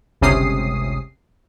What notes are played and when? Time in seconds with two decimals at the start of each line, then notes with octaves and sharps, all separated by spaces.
0.21 G1 C#2 C3 C#4 D#6 C7